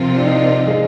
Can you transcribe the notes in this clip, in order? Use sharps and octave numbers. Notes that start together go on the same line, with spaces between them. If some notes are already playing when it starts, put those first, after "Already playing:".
Already playing: C3 F3 C4 F4 A#4
D4
D#4
G#3